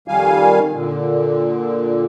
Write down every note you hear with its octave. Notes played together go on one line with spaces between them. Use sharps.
F2 D#3 G3 F5 G#5
A#2 D3